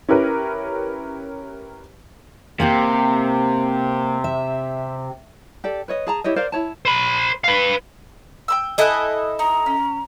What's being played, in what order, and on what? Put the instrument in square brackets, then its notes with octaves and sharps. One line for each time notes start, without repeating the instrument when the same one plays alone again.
[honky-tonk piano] C#4 E4 G4 A#4 B4
[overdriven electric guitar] C3 [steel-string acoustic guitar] A#3 C4 G4
[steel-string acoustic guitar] E5
[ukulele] G4 A4 D5
B4 C#5 D#5
G#4 A5 A#5
E4 G4 C#5 D#5
A#4 C5 D5 F5
E4 C#5 A5
[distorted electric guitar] C5 B5
B4 F5
[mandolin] G5 B5 E6
[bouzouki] E4 A4 D#5 [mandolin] G#5 F#6
[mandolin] D#4 [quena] A#5
[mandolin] C#4